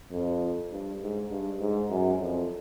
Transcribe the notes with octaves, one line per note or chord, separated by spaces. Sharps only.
F2
G2
G#2
G2
G#2
F#2
F2